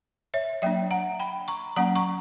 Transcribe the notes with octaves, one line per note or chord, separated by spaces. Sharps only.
C#5 E5
F#3 A#3 D4 E5 G5
F#5 A#5
G5 B5
A#5 C#6
F#3 A#3 C#4 F#5 A#5
A#5 C#6